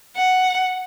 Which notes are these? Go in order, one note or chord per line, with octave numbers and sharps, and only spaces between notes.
F#5